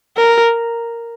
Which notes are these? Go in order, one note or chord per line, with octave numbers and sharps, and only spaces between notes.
A#4